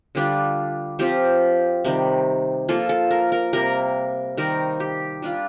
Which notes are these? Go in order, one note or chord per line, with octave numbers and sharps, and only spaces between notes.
D3 G3 D4 F4
F3 C4 F4 G4
C3 D#3 G3
F3 A#3 F4 A4
A4
A#4
A#4
C3 G3 A#3 A#4
D#3 G3 C4 D#4 A#4
G4
G3 D4 F4